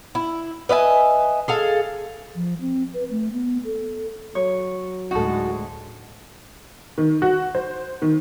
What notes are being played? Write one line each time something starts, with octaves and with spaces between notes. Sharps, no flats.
E4
B4 D#5 E5 G#5
G#4 A4 F5
F3
C4
B4
A3
B3
A4
F#3 C#5
D2 A2 G#3 D#4 F#4 A4
D#3
F#4
C5
D#3